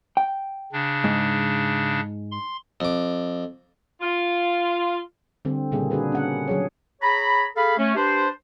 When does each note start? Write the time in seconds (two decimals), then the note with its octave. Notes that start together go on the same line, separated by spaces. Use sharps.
0.17 G5
0.73 C#3 D4
1.04 G#2
2.32 C6
2.80 F2 D6
4.01 F4
5.45 D3 G3 C4
5.72 A#2 C#3 G3 A#3 G#4
5.91 D4 F#4 G#4 B4
6.12 C#4 F#5
6.48 F#3 G#4 C#5
7.01 G#4 C#5 A#5 B5
7.56 G#4 A4 F5 B5
7.78 A3 C#4
7.96 D4 G4 B4 C5